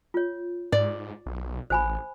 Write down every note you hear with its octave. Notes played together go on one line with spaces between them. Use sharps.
F4 C#5
G#2 D5
B1
A1 C5 G#5 B5